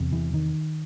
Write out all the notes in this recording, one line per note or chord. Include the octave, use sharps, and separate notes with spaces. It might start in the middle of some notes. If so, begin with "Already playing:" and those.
Already playing: E2 C3
E3
D#3